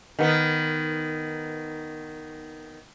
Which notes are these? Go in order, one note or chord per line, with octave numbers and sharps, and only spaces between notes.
D#3 B3